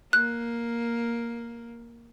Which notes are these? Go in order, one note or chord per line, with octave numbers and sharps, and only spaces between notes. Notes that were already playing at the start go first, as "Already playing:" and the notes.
A#3 F#6